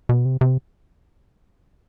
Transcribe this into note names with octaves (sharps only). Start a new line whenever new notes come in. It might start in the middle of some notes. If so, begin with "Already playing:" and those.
B2
C3
C3